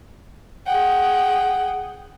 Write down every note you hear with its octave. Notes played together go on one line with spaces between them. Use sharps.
G#4 F#5 G5